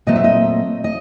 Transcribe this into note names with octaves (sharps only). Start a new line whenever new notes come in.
A#2 F#3 A3 C4 D#5
E5
D#5
D#5